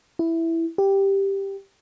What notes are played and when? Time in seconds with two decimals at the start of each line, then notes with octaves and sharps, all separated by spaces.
0.19 E4
0.78 G4